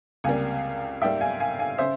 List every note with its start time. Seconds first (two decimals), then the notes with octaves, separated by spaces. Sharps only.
0.24 C#2 C3 G3 A#3 F5 G#5
1.01 G#2 G3 A#3 E5 G5
1.21 F5 G#5
1.40 F5 G#5
1.59 F5 G#5
1.78 C#3 C5 E5